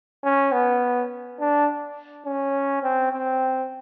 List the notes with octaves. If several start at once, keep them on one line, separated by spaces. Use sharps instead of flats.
C#4
B3
D4
C#4
C4
C4